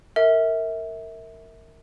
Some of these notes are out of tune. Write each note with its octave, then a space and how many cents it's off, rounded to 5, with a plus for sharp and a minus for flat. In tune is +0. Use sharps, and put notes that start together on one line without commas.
A#4 -20 E5 -25